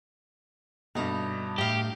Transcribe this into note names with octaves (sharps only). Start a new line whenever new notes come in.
G2 B2 A3 D#4
A2 G4 D#5 F5